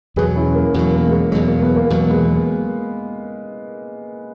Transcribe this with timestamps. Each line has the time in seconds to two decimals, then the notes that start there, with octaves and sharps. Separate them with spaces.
0.16 E2 B2 F#3 G#4 B4
0.35 C#4 E4
0.55 A#3
0.74 E2 B2 F#3 A#3
0.94 A#3
1.07 G#3
1.12 A#3
1.32 E2 B2 F#3 G#3
1.47 A#3
1.61 G#3 B3
1.76 A#3
1.90 E2 B2 F#3 A#3
2.09 G#3 B3